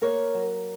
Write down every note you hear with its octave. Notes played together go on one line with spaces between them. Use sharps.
A#3 A#4 C#5
F#3